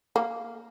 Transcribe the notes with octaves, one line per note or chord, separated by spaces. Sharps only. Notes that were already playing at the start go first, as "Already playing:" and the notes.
A#3